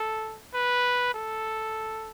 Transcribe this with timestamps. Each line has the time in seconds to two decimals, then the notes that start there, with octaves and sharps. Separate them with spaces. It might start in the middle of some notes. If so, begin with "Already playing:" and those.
Already playing: A4
0.54 B4
1.14 A4